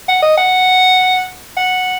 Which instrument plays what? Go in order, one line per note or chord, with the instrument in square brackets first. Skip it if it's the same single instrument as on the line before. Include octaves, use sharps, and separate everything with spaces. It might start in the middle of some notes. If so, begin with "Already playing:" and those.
[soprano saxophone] F#5
D#5
F#5
F#5